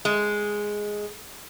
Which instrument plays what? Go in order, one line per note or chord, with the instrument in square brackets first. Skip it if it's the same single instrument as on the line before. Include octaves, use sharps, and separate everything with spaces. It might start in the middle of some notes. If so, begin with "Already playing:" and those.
[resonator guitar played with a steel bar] G#3